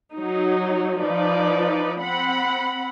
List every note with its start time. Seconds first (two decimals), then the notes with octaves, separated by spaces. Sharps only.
0.14 F#3 D#4
1.00 F3 D#4 B4 D5
2.00 C4 F#5 B5